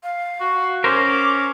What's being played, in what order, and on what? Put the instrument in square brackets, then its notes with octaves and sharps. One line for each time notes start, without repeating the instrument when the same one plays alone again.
[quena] F5
[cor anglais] F#4
[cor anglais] C#4 [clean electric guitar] A#4 C5 [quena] D6